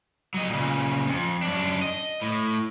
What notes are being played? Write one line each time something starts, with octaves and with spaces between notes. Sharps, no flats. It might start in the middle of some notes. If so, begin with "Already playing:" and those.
F#3 D#5
A#2 C#3
F2
F#2 D4
D#5
A2